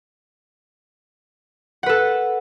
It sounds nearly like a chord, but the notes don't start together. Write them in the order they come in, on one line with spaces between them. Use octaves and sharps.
F#5 B4 A4